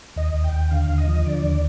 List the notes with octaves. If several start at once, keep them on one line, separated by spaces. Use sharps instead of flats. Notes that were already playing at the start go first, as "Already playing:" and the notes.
D#2 D#5
D#2
G5
D#2
D3 F5
D#2
D#5
F3
D3 D5
D#2